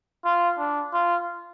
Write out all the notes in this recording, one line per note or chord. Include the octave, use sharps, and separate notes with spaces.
F4
D4
F4